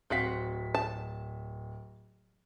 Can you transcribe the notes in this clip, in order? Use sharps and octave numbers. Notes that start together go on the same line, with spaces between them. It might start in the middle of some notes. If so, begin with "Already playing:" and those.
D1 C4 F#4 F5 B6
A5